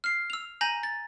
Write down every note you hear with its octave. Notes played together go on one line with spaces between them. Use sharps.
F6 C7
E6 F7
G#5 A#5 G6 A#6 D#7 F#7
A6